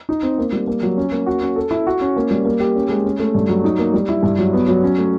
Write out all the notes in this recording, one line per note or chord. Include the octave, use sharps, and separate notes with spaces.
D#4
C4
A#3
G3
A#3
F#3
C#4
A#3
F#4
C#4
A4
E4
F#4
C#4
A#3
G3
A#3
G4
C#4
G#3
C#4
A3
G2
F#3
D#4
A#3
G3
E4
G2
F#3
B3
F#3
C#4
A3